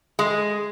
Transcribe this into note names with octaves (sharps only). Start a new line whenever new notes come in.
G#3